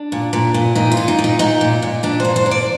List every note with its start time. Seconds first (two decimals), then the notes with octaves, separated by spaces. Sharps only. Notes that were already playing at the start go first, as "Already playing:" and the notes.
Already playing: D4
0.12 A#2
0.33 A#2
0.54 A#2
0.75 A#2 D#4
0.92 F4
0.97 A#2
1.08 D#4
1.19 A#2
1.24 D#4
1.39 A#2 D#4
1.61 A#2
1.82 A#2
2.03 A#2 D4
2.20 A#2 C5
2.36 C5
2.46 A#2
2.51 D5